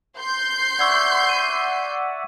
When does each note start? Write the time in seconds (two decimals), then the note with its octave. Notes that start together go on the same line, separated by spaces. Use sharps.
0.19 C6 G6
0.79 D5 E5 F#5 C#6 E6 G#6
1.29 D#7